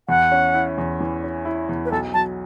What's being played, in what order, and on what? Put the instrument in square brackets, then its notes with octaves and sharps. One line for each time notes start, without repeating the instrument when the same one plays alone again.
[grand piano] E2 [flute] F#5
[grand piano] C#4
E4
E2
E3
C#4
E4
E2
[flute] B4
[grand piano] B1 [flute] A4
[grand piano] F#3 [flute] A5